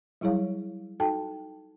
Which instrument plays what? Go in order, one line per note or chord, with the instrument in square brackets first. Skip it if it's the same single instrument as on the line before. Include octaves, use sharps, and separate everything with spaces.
[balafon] F#3 G3 E4 G#4 C#5 F5
D#4 F#4 A4 G5 A5